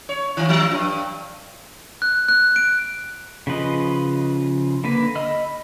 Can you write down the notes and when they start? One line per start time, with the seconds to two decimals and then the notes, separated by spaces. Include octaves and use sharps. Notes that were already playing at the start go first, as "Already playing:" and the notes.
0.09 C#5
0.37 D#3
0.49 F3
0.71 G2
2.02 F#6
2.28 F#6
2.56 D7
3.47 C#3 F3 B4 D#5
4.84 D3 A#3 B4
5.15 D#5 B5 E6 F6